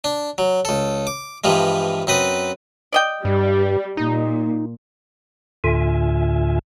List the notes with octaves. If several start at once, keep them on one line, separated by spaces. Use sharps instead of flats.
D4
F#3
C#2 A4
D6
G2 E3 F3 G3 G#3
F#2 C4 B4 D#6
D5 D#5 G5
G2 G3
A#2 D#4
D2 A2 D3 F4 E5 G#5